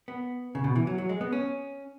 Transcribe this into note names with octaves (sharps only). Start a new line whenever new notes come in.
B3
C#3
B2
E3
F#3
F#3
G#3
B3
C#4